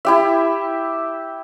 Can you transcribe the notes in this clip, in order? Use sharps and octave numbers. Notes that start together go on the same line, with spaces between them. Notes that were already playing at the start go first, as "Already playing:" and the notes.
E4 G4 E5